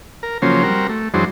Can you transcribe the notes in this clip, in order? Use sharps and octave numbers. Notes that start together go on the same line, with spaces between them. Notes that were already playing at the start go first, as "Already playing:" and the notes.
A#4
C#3 F3 F#3 A#3 C#4 C5
G3 C4 F#4 A#4
A3
F#2 E3 F#3 G#3 D4 C5